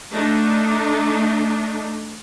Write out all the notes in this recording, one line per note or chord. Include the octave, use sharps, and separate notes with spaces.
A3 D4 D#4